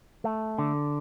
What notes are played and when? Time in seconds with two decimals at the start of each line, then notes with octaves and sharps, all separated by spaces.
0.24 A3
0.59 D3